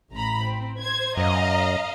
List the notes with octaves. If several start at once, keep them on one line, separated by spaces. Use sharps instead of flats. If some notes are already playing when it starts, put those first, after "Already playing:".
A1 A#5 B5
C4
C5 G#6
F#2 D#5 F5 A#5